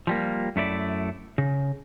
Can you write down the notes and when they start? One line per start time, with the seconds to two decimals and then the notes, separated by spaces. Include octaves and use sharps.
0.07 F3 G3 A#3
0.56 F#2 A3 E4 D5
1.38 C#3